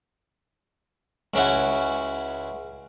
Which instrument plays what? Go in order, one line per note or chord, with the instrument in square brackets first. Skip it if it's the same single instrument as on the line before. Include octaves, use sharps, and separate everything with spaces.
[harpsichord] C#2 C#3 C#4 E4 F#4